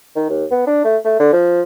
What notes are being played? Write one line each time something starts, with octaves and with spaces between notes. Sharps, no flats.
D#3
D#2
B3
D4
A3
A3
D3
F3